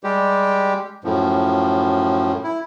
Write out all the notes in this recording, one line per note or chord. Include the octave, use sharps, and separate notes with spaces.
G3 G#3 G4
F#2 A2 F3
E4